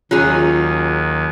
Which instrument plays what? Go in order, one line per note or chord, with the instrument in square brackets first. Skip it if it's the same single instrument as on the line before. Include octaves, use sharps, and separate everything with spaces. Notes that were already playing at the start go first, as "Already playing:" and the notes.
[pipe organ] D#2 [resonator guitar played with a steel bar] F#3 C#4 G#4 [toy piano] F4